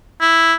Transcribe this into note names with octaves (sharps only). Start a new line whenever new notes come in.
E4